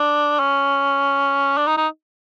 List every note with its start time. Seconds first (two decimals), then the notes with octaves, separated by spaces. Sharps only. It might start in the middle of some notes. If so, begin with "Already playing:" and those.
Already playing: D4
0.39 C#4
1.57 D4
1.67 D#4
1.77 D#4